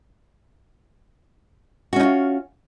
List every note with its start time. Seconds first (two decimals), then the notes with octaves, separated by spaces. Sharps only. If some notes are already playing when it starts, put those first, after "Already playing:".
1.93 F#4
1.96 C#4
2.00 D#4
2.03 F4